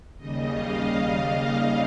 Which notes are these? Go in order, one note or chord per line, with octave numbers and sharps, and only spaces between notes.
D#2 C#3 G3 D#5
F5